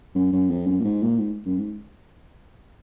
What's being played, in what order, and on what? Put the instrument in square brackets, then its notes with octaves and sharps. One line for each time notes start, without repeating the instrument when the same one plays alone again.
[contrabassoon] F#2
F#2
F2
F#2
A#2
G#2
A#2
G#2
F#2
G#2